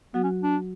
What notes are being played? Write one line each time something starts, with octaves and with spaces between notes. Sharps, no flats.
F#3 B3 F#4
C#4
D4